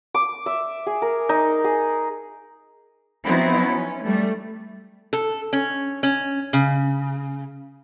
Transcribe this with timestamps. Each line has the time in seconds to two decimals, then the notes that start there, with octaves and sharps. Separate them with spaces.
0.14 D6
0.46 E5
0.86 G#4
1.02 A#4
1.29 D#4
1.64 G#4
3.24 F3 F#3 B3 C4 D#4 E4
3.64 C#4
4.03 G3 A3
5.13 A4
5.53 C#4
6.03 C#4
6.53 C#3